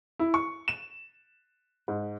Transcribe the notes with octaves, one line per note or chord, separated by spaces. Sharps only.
E4
C#6
E7
G#2